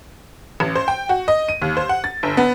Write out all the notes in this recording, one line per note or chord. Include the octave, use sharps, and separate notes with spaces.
A1
C5
G5
F#4
D#5
D#7
D#2
C5
F#5
A6
G1
B3